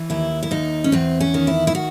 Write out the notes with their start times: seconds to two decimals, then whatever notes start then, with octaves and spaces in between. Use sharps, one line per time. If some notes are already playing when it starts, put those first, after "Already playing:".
Already playing: E3
0.10 D#2 E4
0.43 E4
0.51 D#2 D#4
0.84 C#4
0.92 E2 C4
1.20 C#4
1.34 D#3
1.47 E4
1.67 E4
1.75 F#4